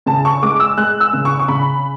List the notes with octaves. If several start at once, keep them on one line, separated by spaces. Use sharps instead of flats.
C#3 A5
C#6
G#3 D6
E6
G#3 F#6
E6
C#3
C#6
C#6
C#3 B5